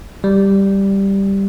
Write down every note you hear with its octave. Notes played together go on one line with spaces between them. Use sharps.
G3